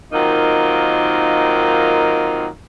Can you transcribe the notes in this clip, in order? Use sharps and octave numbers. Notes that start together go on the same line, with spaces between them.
D#3 F#3 A#3 C4 D#4 F4